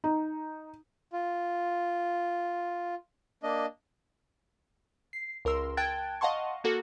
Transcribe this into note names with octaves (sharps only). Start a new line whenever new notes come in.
D#4
F4
A#3 D4 D#5
C7
C#2 A#4 C6 E6
G5 A5 F#6 G#6 A6 D7
D#5 F5 F#5 A5 C6 C#6
A#3 F#4 A4